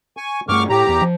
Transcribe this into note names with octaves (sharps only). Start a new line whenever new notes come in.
G#5 C#6
G2 A3 C#6 D6 F6
A2 G4 A#5
E2
F3